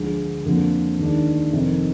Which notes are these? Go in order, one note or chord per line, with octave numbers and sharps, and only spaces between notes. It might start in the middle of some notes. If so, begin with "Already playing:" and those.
Already playing: D2 D3 F3 G#3
F2 D3 F3 A#3
D#2 D#3 G#3 D4
F1 F2 D#3